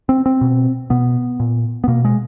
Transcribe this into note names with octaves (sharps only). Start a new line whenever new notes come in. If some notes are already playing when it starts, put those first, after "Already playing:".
C4
C4
B2
B2 B3
A#2
B3
B2 A#3
G#3